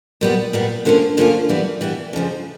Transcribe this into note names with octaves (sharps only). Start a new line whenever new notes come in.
A#2 G3 B3
A#2 G3 B3
D3 F3 A#3 C#4 F4
D3 F3 A#3 C#4 F4
E3 G3 B3 E4
E3 G3 B3 E4
F2 C#3 F3